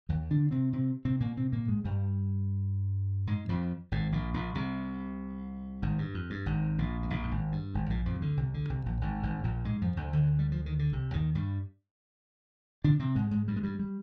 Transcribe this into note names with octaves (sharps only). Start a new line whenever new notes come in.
D#2 D#3
D3 D4
C3 C4
C3 C4
C3 C4
A#2 A#3
C3 C4
A#2 A#3
G#2 G#3
G2 G3
G#2 G#3
F2 F3
G#1 G#2
A#1 A#2
A#1 A#2
C2 C3
G#1 G#2
G2
F2
G2
G#1 G#2
A#1 A#2
G#2
A#1 A#2
G2
G#1 G#2
G2
G#1 G#2
A#1 A#2
F2 F3
C3
D2 D3
C2 C3
D2 D3
C2 C3
A#1 A#2
G#1 G#2
G#1 G#2
A#1 A#2
G#2 G#3
F2 F3
D2 D3
D2 D3
G3
F3
D#3
D3
C2 C3
D#2 D#3
G2 G3
D3 D4
C3 C4
G#2 G#3
G#2 G#3
G2 G3
G#3
G2 G3
G3